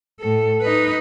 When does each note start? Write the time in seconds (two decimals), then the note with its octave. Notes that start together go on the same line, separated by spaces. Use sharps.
0.20 A2 A4
0.61 D#4 B4